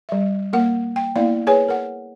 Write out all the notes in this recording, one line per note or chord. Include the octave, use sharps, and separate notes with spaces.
G3 E5
A#3 A#4 F#5
G5
A#3 B3 E4 D5 F5
G#4 B4 C#5 G#5
A#4 F#5